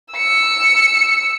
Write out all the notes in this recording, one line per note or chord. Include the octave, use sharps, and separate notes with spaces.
E6 C#7